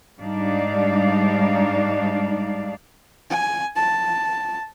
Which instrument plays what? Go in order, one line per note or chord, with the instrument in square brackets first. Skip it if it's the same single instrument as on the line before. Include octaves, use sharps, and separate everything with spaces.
[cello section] G#2 G3 D4 D#4 D5 F5
[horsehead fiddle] G#5
A5